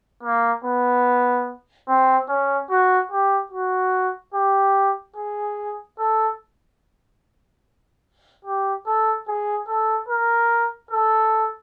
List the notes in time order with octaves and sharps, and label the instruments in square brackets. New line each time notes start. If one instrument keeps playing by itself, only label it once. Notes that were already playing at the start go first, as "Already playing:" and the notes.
[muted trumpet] A#3
B3
C4
C#4
F#4
G4
F#4
G4
G#4
A4
G4
A4
G#4
A4
A#4
A4